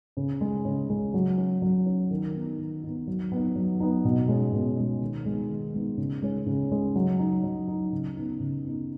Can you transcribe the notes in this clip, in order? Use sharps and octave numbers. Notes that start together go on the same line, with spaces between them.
C#3
G#3 C#4
C#3
G#3 C#4
F#3
C#4
F#3
C#4
D#3
B3 D#4
D#3
B3 D#4
F#3
B3 D#4
F#3
B3 D#4
B2
G#3 C#4
B2
G#3 C#4
D#3
G#3 B3 D#4
D#3
G#3 B3 D#4
C#3
G#3 C#4
C#3
G#3 C#4
F#3
D#4
F#3
D#4
C#3
B3 D#4
C#3
B3 D#4